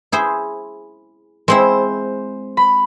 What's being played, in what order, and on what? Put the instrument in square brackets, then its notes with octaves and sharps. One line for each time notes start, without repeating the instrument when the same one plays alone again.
[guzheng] E4 G#4 C5
[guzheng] G#3 C4 E4 [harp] C5
[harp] B5